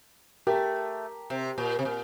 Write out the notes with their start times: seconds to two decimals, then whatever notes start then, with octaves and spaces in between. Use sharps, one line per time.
0.47 A3 G4 A#4
1.30 C3
1.58 A#2
1.79 C3
1.85 A#2